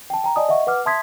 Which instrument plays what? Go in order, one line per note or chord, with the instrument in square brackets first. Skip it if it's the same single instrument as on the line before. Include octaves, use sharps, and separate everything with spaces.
[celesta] G5 A5
G5 A#5
D5 D#5 G#5 A5 D#6
D#5 E5 F#5 C#6
B4 F#5 D6 F6
E5 A5 C6 D#6 G#6 B6